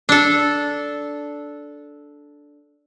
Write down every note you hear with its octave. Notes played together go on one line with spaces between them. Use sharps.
D4 A4